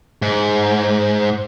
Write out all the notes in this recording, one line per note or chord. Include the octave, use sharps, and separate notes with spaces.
G#2